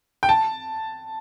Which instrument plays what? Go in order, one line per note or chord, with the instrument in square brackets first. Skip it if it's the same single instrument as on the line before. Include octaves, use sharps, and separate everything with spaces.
[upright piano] G5
A5